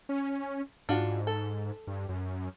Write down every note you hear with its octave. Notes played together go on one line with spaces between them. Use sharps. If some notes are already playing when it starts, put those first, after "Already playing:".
C#4
G#2 D4 F4 F#4
A4
G2
F#2